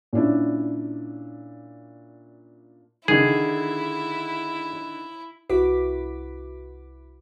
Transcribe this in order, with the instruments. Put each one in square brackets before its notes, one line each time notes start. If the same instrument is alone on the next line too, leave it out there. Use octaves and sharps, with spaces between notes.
[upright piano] A#2 C#4 D4 E4
[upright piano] D3 D#3 [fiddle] E4 [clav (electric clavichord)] G#4
[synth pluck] C2 E4 F#4 B4 D6 B6